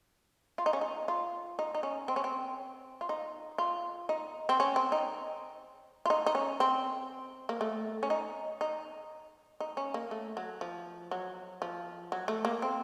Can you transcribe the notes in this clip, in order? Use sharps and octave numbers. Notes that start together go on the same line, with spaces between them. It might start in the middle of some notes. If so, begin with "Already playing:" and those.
F4
D#4
C#4
D#4
F4
D#4
D#4
C#4
C4
C#4
C4
F4
D#4
F4
D#4
C4
C#4
C4
D#4
F4
D#4
D#4
C#4
C4
A#3
A3
C#4
D#4
D#4
D#4
C#4
A#3
A3
F#3
F3
F#3
F3
F#3
A3
A#3
C4